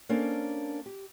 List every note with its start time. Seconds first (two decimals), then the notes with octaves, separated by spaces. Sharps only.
0.09 A#3 C#4 D4 A4 A#4 C5
0.86 G4